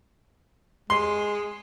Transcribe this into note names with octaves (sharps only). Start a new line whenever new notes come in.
G#3 C6